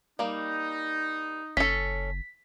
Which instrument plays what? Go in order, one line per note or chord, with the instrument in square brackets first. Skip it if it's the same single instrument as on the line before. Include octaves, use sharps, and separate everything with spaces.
[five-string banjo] G3 A#3 [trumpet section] D#4
[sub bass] F#1 [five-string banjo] C#4 A4 [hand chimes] B6